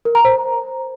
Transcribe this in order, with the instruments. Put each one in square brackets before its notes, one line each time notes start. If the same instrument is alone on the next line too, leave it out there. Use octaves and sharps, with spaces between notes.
[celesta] A#4
A#5
C5